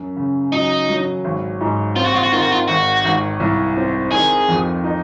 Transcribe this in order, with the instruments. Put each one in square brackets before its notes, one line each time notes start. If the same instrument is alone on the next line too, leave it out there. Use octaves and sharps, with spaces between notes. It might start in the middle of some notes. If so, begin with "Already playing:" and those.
Already playing: [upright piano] F#2
C#3
[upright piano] F#3 [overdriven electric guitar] D#4
[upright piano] F#3
G#1
G#2
[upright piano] C4 [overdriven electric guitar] F4
[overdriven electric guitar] F#4
F4
F#4
[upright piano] D#3 [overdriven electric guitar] F4
[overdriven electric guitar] F#4
F4
[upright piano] G#1 [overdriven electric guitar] F#4
[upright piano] G#1
C2
C4
[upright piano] D#3 [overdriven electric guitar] G#4
[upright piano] F2
D#4